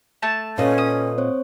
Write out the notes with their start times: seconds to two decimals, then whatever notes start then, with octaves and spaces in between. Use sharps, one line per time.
0.22 A3 A5
0.58 A#2 C#4 A4 B4 C#5 D#5
0.78 D#6
1.18 C4 C5 C#5